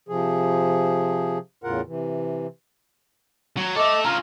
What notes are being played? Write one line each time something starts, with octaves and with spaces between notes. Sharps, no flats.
C3 F3 G#4
E2 A2 C#3 F4 A#4 F#5
C3 E3
F#3
A4 D#5 E5 D6
C#4 F4 A#5